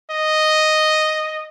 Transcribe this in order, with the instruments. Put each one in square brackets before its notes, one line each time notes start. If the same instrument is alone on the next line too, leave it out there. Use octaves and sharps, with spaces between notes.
[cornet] D#5